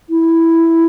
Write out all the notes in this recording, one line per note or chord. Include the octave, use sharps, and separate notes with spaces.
E4